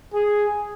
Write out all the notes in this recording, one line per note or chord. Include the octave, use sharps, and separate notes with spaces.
G#4